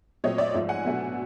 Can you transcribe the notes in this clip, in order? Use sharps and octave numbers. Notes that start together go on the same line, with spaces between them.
A#2 F#3 A3 C4 C#5 D#5
D5 E5
G#2 F3 A3
F#5 G#5
B2 F#3 A3 D4